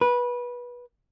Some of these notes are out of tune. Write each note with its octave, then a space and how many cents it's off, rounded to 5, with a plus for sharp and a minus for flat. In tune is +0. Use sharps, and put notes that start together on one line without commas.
B4 -20